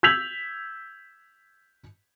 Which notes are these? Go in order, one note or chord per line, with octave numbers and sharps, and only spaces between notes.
E6 G6 G#6 B6 F7 F#7